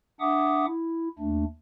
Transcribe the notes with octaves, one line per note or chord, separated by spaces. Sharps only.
D4 E5 F#5 D6 D#6
E4
D#2 A3 D4